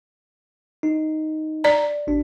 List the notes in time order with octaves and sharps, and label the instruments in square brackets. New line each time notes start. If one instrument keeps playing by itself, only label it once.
[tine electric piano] D#4
[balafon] D5 A#5
[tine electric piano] G#1 D4